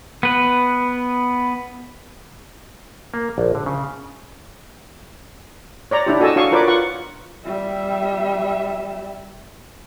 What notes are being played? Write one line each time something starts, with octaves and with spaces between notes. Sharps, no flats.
B3 B4
A#3
A#1
D3
C#3
C#5 D5 A#5
D4 E4 G4
F#4 A4 D#5 G#5 A5 E6
D4 F#4 C#5 F5 C#6 D#6
F4 A#4 B4 C#5 D5 D6
F4 F#5 C#6
G3 E5